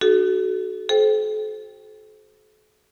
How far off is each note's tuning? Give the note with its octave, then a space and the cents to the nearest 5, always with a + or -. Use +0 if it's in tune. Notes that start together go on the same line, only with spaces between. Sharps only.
D4 +45 F#4 +15 A4 -35
A4 -45 C5 +0 G5 +0